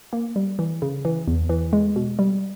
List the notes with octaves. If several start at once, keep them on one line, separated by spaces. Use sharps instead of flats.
A#3
G3
E3
C#3
E3
E2
E3
G#3
B2
G3